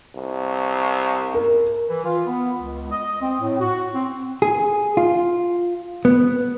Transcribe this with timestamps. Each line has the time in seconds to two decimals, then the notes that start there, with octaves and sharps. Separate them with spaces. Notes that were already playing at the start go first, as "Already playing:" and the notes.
0.15 C2
1.34 A#4
1.87 E3
2.05 F4
2.26 B3
2.59 C#2
2.91 D#5
3.21 C4
3.40 A2
3.59 F#4
3.94 C4
4.42 G#4
4.97 F4
6.05 B3